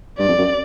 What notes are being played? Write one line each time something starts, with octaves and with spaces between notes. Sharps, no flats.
G2 D5
F2
F#2